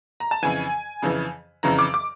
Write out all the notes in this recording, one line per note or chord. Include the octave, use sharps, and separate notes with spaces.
A#5
A5
F2 C#3 E3 G#5
F2 C#3 E3
F2 C#3 E3 A#5
D6
D6